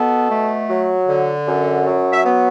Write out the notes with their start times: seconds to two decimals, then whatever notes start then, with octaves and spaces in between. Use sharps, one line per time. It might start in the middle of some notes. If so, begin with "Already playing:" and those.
Already playing: B2 B3 A4
0.30 A3
0.69 F#3
1.08 D3
1.47 F#2
1.86 F#3
2.12 E5
2.25 B3